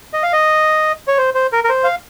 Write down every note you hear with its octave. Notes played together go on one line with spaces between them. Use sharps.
D#5
F5
D#5
C#5
C5
C5
A#4
A#4
C5
F5